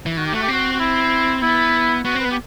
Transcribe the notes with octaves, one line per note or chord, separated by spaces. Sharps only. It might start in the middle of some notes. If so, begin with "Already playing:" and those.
E3
D#3 F#4
G4
A3 F#4
G4
C4 F#4
F#4
E4
B3 E4
B3 F#4
C4 B4
B3
G4